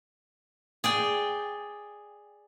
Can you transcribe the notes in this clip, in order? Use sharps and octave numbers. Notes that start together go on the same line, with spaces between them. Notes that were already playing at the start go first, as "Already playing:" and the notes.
G#4 D5 G5